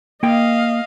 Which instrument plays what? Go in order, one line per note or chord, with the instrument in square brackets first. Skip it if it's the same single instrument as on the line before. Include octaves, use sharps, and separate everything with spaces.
[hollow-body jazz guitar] A#3 G5 [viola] D#5 F5